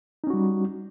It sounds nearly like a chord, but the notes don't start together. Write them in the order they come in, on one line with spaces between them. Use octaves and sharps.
D#4 C#4 F#4 G3